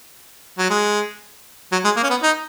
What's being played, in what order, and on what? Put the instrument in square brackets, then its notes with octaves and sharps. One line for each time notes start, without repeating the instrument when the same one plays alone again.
[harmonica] F#3
G#3
F#3
G#3
A#3
C#4
B3
D#4